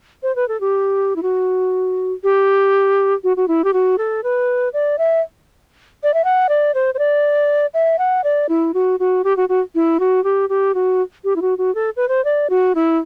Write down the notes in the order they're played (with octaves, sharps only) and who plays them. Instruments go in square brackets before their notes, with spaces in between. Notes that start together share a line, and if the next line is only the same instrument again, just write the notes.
[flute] C5
B4
A4
G4
E4
F#4
G4
F#4
F#4
E4
G4
F#4
A4
B4
D5
E5
D5
E5
F#5
D5
C5
C5
D5
E5
F#5
D5
E4
F#4
F#4
G4
F#4
F#4
E4
F#4
G4
G4
F#4
G4
E4
F#4
F#4
A4
B4
C5
D5
F#4
E4